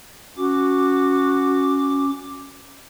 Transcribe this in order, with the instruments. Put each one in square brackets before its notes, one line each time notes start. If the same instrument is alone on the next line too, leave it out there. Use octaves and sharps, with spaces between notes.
[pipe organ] C#4 D6 [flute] F#4